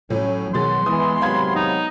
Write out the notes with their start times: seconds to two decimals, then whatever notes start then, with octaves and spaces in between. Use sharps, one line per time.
0.10 A2 F#3 C#4
0.54 B2 D#3 F#3 G#4 C6 A6
0.86 E3 G#3 B3 D#6
1.22 C3 D#3 F#3 F5 B5 G#6
1.55 D#4